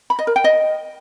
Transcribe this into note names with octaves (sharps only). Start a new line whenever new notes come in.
B5
D#5
A#4
G5
D#5